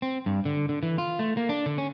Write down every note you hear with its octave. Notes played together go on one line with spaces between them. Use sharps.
C4
G2
D3
D3
E3
F4
A3
A#3
D4
D3
C#4